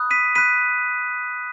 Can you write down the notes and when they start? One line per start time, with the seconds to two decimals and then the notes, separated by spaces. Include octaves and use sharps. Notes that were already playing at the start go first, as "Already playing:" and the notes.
Already playing: B5 D#6 F#6
0.11 B6 D#7
0.35 B5 F#6 B6 D#7